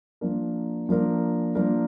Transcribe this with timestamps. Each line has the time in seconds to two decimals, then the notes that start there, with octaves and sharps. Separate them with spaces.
0.21 F3 A#3 D4 A#4
0.89 F3 A#3 D4 A#4
1.55 F3 A#3 D4 A#4